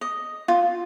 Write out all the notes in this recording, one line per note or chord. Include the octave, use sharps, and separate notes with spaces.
D#5
F4